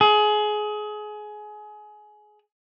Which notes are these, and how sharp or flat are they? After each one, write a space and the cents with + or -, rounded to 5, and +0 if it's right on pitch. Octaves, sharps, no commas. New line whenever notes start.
G#4 +25